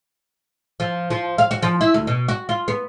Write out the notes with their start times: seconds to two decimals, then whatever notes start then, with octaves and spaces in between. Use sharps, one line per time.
0.80 F3
1.10 F3
1.38 F5
1.51 F#4
1.62 F3
1.81 E4
1.94 D2
2.07 B2
2.28 F#4
2.49 F4
2.68 B3